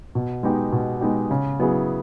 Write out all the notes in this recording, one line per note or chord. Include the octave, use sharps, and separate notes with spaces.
B2
G#3 B3 D#4 G4
B2
G#3 B3 D#4 G4
C#3
F#3 B3 E4 G#4